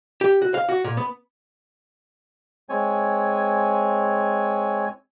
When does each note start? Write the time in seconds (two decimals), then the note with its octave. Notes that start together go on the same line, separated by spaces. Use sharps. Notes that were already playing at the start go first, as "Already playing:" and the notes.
0.21 G4
0.42 F#4
0.54 F5
0.69 F#4
0.84 A#2
0.97 B3
2.69 G#3 C4 C#5 G#5